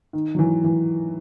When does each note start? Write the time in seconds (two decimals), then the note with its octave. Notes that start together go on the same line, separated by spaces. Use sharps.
0.13 D#3
0.35 F#3
0.39 E3
0.64 E3